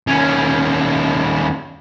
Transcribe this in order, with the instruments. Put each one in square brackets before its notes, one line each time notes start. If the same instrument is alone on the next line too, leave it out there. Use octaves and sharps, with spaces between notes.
[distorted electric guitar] D#2 C#4